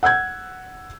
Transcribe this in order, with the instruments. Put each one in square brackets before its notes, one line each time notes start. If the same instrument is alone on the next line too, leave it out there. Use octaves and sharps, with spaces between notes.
[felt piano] F#5 E6 G6 G#6